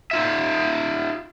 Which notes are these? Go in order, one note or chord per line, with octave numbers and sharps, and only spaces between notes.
D#4 F4 E5